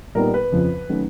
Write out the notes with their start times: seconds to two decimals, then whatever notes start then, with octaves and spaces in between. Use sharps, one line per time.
0.15 A#2 G3 B3 D#4 A#4
0.34 B4
0.52 F2 C#3 F3
0.89 D#3 F#3 A3 C#4